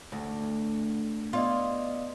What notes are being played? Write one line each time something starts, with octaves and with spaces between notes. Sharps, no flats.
D2
B3 F4 D5 D#5